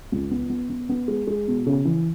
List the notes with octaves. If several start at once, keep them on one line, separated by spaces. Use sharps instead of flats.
C#2
B3
B3
B3
B3
G#3
G#3
B2
C#3
E3